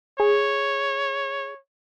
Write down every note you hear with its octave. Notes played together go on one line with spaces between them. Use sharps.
G#4 C#5